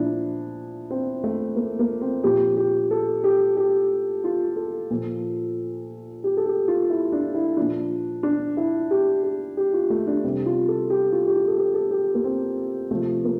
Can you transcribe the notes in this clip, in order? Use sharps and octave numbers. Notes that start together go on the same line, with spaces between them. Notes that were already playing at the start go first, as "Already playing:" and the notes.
Already playing: A#2 F3 D4 E4
C4
A3
A#3
A#3
C4
A#2 F3 G4
G4
A4
G4
G4
F4
A4
A#2 F3
G4
A4
G4
F4
E4
D4
E4
A#2 F3 D4
D4
E4
G4
G4
G4
F4
A3
D4
C3 G3
F4
A4
G4
F4
G4
F4
A4
G4
A4
G4
A#3
C4
C3 F3 A3
A#3